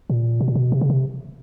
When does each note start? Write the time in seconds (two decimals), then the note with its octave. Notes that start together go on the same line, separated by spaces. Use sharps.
0.10 A#2
0.41 B2
0.48 A#2
0.55 B2
0.72 C3
0.81 C#3
0.90 C3